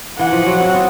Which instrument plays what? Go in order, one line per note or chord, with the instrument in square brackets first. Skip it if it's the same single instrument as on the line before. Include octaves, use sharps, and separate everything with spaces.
[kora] E3 [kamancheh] F#5
[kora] F3
F#3
C4
B3